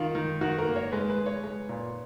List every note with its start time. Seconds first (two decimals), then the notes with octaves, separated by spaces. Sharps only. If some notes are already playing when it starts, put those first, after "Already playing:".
Already playing: D#3 F4
0.15 D#3
0.41 D#3 F#4
0.58 A#4
0.67 A#3
0.76 C#5
0.92 G#3 B4
1.10 B4
1.18 G#3
1.26 C#5
1.43 G#3
1.69 A#2